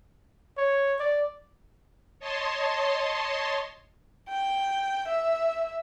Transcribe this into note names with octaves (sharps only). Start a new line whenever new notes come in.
C#5
D5
C#5 D#5 A5 C6
G5
E5